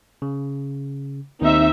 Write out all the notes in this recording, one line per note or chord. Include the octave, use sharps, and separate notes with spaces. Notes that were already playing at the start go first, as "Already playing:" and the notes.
C#3
D#2 C4 D#4 E5